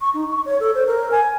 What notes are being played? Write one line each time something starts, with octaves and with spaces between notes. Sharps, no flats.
C#6
D#4
C#6
C#5
A4
C5
A#4
G#5